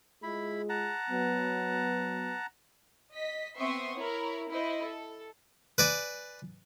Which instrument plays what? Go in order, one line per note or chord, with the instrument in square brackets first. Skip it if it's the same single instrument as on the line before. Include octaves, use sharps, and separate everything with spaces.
[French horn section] G#3 F4 G#4 [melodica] E4 B5
[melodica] F#5 A5 A#5
[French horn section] F#3 B3
[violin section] D#5 B6
B3 C4 E5 C6 C#6 D#6
E4 A#4 C#5
E4 C5 D#5
A4
[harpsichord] B4 D5 G#5